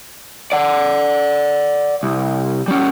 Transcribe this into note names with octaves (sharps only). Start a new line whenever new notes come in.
D5 F#5
C2
G3 C#4